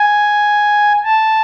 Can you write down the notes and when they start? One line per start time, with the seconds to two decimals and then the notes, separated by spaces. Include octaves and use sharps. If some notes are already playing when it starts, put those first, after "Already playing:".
Already playing: G#5
1.04 A5